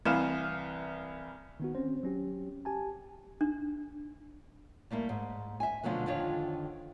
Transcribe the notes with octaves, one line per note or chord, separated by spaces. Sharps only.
C2 E3 B4 F5 F6 E7
D#3 B3 F#4
C4 C#4 C5
F#3 C#4 G4
G4 G#5 A5
D4
G3 A3 A#3 E4
G#2
E5 G#5
B2 D3 F3 F#3 A3 B3
F2 D3 D#3 F4 C#5